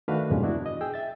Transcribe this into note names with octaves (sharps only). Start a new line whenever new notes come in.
D#3 A3 D4 F#4 B4 F5
E2 G2 A#2 C#3 G#3
B3 D4 E4 F#4
D#5
G#4 G5 E6
E5 A6